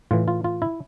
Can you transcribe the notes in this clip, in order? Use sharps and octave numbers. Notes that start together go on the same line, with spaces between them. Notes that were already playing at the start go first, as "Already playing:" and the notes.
A2 E3 F4
F4
F4
E4